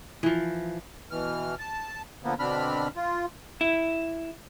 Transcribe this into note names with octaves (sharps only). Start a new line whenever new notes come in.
E3 F3
B2 E3 F6
A5
D3 F3 A#3 B3
B2 D3 C4 D4 B5 F6
F4
E4